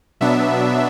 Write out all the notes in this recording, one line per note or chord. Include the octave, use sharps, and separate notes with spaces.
B2 F#3 B3 D4 E5